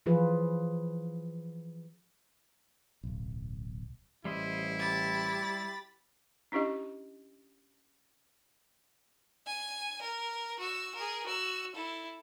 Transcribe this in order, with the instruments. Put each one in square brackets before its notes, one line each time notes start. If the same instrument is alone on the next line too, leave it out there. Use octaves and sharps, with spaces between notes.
[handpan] E3 F3 F4 G#4 B4
[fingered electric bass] D1 B1
[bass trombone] A1 [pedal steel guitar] G3 C5 D#5 [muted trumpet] E4
[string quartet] G4 B5 A6
[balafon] C#4 D4 E4 G4 D#5
[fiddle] G#5
A#4
F#4 E6
G#4 A#4
F#4 E6
E4 A4